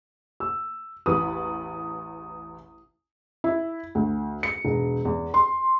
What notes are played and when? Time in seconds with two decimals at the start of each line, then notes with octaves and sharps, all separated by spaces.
0.40 E6
1.06 A1 E2 B4 D#6
3.44 E4
3.95 D2
4.43 C#7
4.65 E1
5.05 E2
5.34 C6